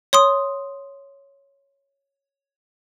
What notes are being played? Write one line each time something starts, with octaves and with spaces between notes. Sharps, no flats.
C#5 C6 D#6